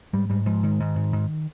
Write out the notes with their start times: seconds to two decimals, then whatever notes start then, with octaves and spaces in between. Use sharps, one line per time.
0.13 G#2 G3
0.30 G#2 G3
0.46 G#2 F3
0.63 G#2 D#3
0.80 G#2
0.95 G#2
1.12 G#2